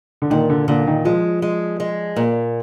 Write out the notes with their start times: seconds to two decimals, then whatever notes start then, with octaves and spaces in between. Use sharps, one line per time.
0.22 D3
0.30 A#2 D#3
0.50 D3
0.68 A#2 D3
0.87 D#3
1.05 F3 G#3
1.42 G#3
1.80 G#3
2.16 A#2